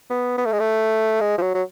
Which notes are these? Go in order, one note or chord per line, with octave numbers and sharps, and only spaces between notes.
B3
B3
A3
G#3
A3
G#3
F3
F#3
F#3